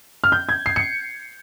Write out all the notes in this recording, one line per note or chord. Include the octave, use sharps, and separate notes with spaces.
F6
G6
G#6
C7
C#7